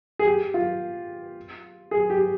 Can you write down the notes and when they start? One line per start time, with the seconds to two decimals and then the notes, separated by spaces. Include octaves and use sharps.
0.19 G#4
0.27 G4
0.54 F4
1.91 G#4
2.10 G4